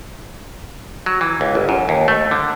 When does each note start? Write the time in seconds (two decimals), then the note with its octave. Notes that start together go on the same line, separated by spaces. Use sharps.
1.06 F#3
1.21 E3
1.41 C#2
1.55 G1
1.69 F#2
1.89 D#2
2.08 A3
2.31 D3